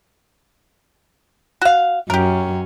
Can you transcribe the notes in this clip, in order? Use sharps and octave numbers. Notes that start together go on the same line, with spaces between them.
F#4 F5
F#2 C#4 G4 A#4